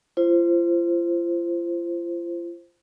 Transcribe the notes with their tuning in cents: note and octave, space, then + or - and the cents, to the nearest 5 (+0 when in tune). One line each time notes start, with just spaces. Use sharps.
F4 -40 C5 +0